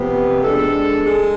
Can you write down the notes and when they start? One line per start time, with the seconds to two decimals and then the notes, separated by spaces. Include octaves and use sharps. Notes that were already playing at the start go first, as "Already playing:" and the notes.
Already playing: C3 F3 B3
0.42 G#3 D4 A4
1.06 G#3